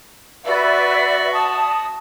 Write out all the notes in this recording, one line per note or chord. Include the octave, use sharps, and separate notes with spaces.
F#4 B4 D5 E5
A5 D#6